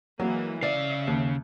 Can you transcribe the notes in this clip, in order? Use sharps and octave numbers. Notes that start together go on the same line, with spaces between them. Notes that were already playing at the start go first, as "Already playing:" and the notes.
E3 F#3 G#3 A#3
C#3 D5 E5 F5
D#2